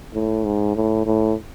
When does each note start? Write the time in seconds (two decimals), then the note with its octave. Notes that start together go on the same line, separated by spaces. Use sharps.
0.14 A2
0.45 G#2
0.76 A2
1.06 A2